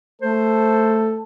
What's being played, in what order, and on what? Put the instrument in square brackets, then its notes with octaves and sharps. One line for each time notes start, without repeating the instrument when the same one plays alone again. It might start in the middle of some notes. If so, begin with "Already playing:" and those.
[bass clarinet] A3 [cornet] A4 [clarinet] C5